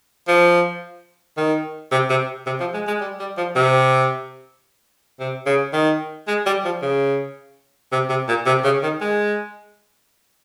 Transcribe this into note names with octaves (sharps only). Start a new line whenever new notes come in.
F3
D#3
C3
C3
C3
F3
G#3
G#3
G3
G3
F3
C3
C3
C#3
D#3
G#3
G3
F3
C#3
C3
C3
A#2
C3
C#3
D#3
G#3